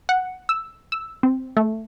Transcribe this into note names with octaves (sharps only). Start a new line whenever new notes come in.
F#5
E6
E6
C4
A3